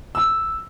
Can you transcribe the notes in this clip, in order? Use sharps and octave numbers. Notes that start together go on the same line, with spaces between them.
E6